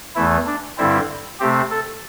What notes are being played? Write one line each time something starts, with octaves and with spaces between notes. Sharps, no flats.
E2 E3 A3 E4
D4
G2 D3 G3 C4 E4
C3 A3 C4 G4
A4